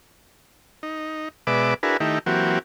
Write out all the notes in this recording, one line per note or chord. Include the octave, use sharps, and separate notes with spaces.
D#4
B2 G#3 B4 D5 E5 D6
D4 E4 F#4 G#4 A#4 B4
D#3 A3 D#4 E4 G4
E3 F#3 A#3 C4 F#4 G4